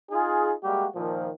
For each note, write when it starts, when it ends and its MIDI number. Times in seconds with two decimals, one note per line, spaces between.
0.11 0.53 63
0.11 0.53 65
0.11 0.53 68
0.64 0.86 55
0.64 0.86 56
0.64 0.86 58
0.64 0.86 66
0.64 0.86 67
0.95 1.29 46
0.95 1.29 51
0.95 1.29 53